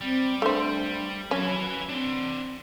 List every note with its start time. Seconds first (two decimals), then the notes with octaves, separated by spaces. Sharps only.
0.01 G3 C4
0.42 A3 D4 C5
1.31 F#3 C#4 B4 G#5
1.89 C4 D4 C6